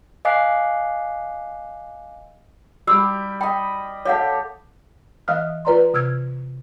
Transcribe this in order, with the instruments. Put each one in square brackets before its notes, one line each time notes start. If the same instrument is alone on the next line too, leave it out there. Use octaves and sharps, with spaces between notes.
[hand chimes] D#5 F5 G#5 D6 F#6 C7
[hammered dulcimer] G3 G5 [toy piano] G4 C6 E6
[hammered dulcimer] D#5 B5 [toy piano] G5
[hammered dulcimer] G4 A4 [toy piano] C#5 F5 F#5
[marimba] E3 D#5 F5 D#6 F6 F#6
F4 B4 D5 A#5 C6
C3 E6 F6 G#6